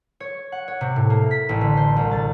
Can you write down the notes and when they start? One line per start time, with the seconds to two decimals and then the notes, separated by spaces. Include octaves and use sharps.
0.20 C#5
0.52 F#5
0.68 C#5
0.81 C3
0.96 A2
1.10 A#3
1.31 B6
1.49 A1
1.61 D3
1.77 C5
1.96 C2
2.11 A6